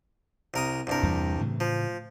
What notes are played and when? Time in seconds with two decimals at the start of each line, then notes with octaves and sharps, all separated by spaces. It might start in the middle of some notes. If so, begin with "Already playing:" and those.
0.54 C2 A#4 D#6
0.87 C2 G2 A#4
1.03 E2 G3
1.39 A2 C#3 E3
1.60 F3